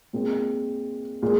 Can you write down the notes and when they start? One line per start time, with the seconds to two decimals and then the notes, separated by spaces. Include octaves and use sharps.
0.13 A#2 G#3 C4
1.22 A#2 G#3